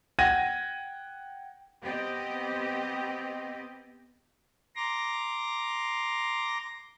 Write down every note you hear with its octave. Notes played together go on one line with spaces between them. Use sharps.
F#5 G5 G#6 A#6 D#7
B3 C4 G4 D#5
A#5 C6 D6 A#6